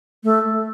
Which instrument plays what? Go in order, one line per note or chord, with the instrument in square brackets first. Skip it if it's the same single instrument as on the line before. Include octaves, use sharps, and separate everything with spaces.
[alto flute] A3